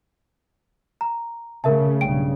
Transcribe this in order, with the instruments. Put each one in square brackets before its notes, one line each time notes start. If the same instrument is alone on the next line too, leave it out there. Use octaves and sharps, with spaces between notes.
[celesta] A#5
[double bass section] C#3 A3 [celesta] A#4 E5 A5
[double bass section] B1 G2 C#3 [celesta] G5 D7